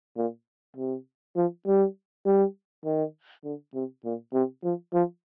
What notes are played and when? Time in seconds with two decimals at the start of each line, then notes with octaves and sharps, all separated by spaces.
0.17 A#2
0.77 C3
1.36 F3
1.67 G3
2.26 G3
2.85 D#3
3.44 D3
3.74 C3
4.05 A#2
4.34 C3
4.64 F3
4.93 F3